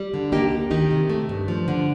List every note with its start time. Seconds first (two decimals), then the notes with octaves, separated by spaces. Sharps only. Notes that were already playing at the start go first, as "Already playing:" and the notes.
Already playing: G3
0.14 D3
0.32 A#3 D#4 G4
0.51 D2
0.71 D#3 D#4 G4
0.91 C3
1.09 A3
1.29 G2
1.48 F3
1.68 D3